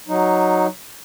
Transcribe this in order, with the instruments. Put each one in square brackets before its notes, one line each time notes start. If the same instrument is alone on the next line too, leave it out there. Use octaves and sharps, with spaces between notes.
[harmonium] F#3 D#4